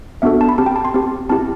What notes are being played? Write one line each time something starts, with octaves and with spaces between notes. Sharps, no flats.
B3 D4 F#4 A4 E5
A5
B5
C4 G4 A5
G5
A5
C6
C4 G4
C4 E4 G4 A5